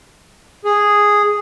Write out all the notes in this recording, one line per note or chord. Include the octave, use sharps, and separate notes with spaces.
G#4